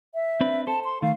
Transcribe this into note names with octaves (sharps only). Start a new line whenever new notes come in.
E5
C4 D4 B4
A4 C5 A5
C6
D#3 A3 F5